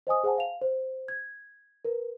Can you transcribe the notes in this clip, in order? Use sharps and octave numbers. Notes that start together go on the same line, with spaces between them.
C5 D#5 G#5 D#6
G#4 C5 F#5 G#5 A5
F5 F7
C5
G#6
A#4 B4